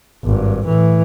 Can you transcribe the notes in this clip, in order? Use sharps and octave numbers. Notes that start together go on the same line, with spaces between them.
G#1 G2
A2 E3